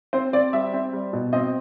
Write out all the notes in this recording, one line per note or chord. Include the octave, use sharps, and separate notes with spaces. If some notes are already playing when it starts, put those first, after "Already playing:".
C4 C5
C4 D5
G3 E5
C4
G3
B2
C4 D#5